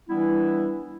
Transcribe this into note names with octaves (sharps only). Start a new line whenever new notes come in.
E3 G3 B3 D4 E4